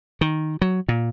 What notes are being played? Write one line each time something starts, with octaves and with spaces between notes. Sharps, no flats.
D#3
F#3
A#2